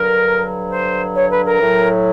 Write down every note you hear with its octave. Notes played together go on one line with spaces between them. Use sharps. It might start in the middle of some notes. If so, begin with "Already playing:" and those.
Already playing: G2 D3 F#3 A#4
C5
C#5
B4
A#4
A2 F#3